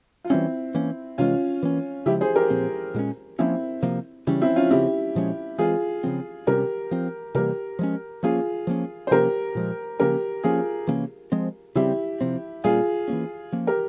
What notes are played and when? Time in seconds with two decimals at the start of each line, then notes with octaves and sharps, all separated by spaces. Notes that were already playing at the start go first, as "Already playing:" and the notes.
0.25 F4
0.30 E3 G3 C4 C#4 E4
0.74 E3 A#3 C#4
1.18 C3 E3 G#3 C#4 F4
1.63 E3 A#3 C#4
2.06 C#3 F3 G#3 E4 G4
2.21 G#4 C5
2.36 G4 A#4
2.50 A#2 F3 C4
2.94 A#2 G#3 C#4
3.39 F3 A#3 C4 C#4 E4
3.82 C3 F3 A#3
4.27 C#3 E3 G3 C#4
4.41 C4 E4
4.56 C#4 F4
4.71 C#3 F3 C4 E4 G4
5.15 A#2 F3 G#3 C#4
5.58 E3 G#3 C4 F4 G#4
6.04 C#3 F3 C4
6.47 C3 G3 C#4 G4 A#4
6.91 F3 C4
7.35 C3 E3 G3 A#3 G4 A#4
7.79 F3 G#3 C#4
8.23 F3 A#3 C#4 F4 G#4
8.67 F3 A#3 C#4
9.07 C5
9.11 C3 F3 A#3 C#4 G4 A#4
9.55 A#2 F3 G#3
10.00 C#3 F3 A#3 C#4 G4 A#4
10.44 F3 A#3 C#4 F4 G#4
10.87 C3 E3 A#3 C#4
11.32 F3 G#3 C4
11.75 C#3 G3 C4 E4 G4
12.21 C3 F3 C4
12.64 A#2 G3 A#3 C#4 F4 G#4
13.08 E3 A#3 C#4
13.52 F3 A#3 C#4
13.67 G4 A#4